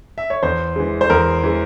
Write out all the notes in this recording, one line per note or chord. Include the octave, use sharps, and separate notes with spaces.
E5
C#5
E2 C5
E3 G#3
C5
E2 A#4
E3 G#3